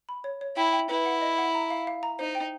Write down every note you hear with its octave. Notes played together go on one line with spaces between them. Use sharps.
B5
C#5
C#5
E4 G5
G5
E4 B4
F#5
D#5
F#5
A#5
F5
F5
A#5
D#4 C5
G5